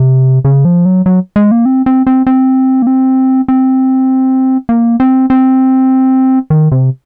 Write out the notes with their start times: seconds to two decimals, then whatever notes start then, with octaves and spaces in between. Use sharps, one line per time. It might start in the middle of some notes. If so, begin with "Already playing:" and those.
Already playing: C3
0.45 C#3
0.65 F3
0.86 F#3
1.06 F#3
1.36 G#3
1.51 A#3
1.65 C4
1.86 C4
2.07 C4
2.27 C4
2.82 A#3
2.87 C4
3.48 C4
4.69 A#3
5.00 C4
5.30 C4
6.50 D#3
6.72 C3